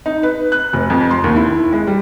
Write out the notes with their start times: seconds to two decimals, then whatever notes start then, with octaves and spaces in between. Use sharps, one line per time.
0.06 D#4
0.23 B4
0.52 F#6
0.73 F1
0.90 F2
1.11 C6
1.24 D#2
1.36 E4
1.73 G#3
1.87 G3